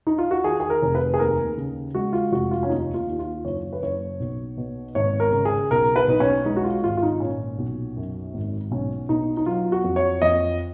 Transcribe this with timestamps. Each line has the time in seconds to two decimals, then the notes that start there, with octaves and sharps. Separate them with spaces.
0.07 D#4
0.18 F4
0.31 F#4
0.44 D#3 G#4
0.60 G#4
0.70 A#4
0.82 F1
0.95 B4
1.14 G#4
1.19 D#2 A#4
1.57 C#3
1.95 G#3 F#4
2.13 F4
2.32 F1 F#4
2.51 F4
2.63 C#4
2.70 D#2 D#4
2.94 F4
3.08 D#2
3.19 F4
3.45 F#1 C#5
3.73 B4
3.83 F#1 C#5
4.20 B1
4.57 B2
4.95 G#1 C#5
5.20 A#4
5.32 C#3
5.45 G#4
5.71 B1 A#4
5.96 B4
6.08 B1 D#4
6.20 C#4
6.45 G#3 D#4
6.57 F#4
6.64 F4
6.83 G#1 F4
6.97 F4
7.03 D#4
7.20 A#2 C#4
7.58 B1
7.97 F#2
8.34 G#1
8.71 B1 C#4
9.09 B2 D#4
9.37 D#4
9.46 F#3 F4
9.72 F#4
9.84 F2
9.96 C#5
10.22 F2 D#5